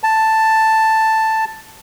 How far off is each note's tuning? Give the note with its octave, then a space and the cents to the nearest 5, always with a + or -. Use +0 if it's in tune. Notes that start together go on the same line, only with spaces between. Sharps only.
A5 +5